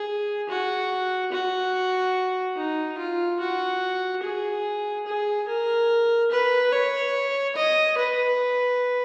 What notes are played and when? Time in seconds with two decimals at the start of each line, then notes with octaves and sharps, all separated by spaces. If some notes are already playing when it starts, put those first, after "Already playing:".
Already playing: G#4
0.49 F#4
1.32 F#4
2.57 D#4
2.98 F4
3.40 F#4
4.23 G#4
5.06 G#4
5.48 A#4
6.32 B4
6.72 C#5
7.56 D#5
7.98 B4